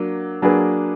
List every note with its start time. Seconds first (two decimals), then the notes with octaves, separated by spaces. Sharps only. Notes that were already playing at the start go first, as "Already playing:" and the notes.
Already playing: F#3 A#3 D4
0.42 F#3 A#3 D4 G#4 B4